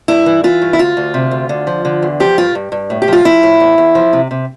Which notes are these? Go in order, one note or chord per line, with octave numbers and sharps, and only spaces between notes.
G2 E4
E3
E3 F4
G2
E4
D2 F4
D2
C3
D2
D3
F3
D3
E2
F3 G4
G2 F4
G2
G2
A2
G4
F3 F4
F3 E4
A2
E2
E2
F3
C3
C3